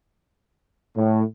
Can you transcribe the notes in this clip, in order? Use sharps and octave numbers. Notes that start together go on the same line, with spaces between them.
A2